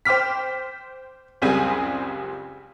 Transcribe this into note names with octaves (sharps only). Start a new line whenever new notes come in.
C5 G5 D6 F6 B6
F#1 C#2 G3 C4 G#4 G#5